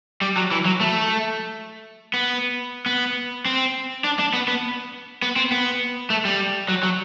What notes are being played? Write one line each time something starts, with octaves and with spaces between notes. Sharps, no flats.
G3
F#3
E3
F#3
A3
B3
B3
C4
D4
D4
B3
B3
B3
C4
B3
A3
G3
F#3
F#3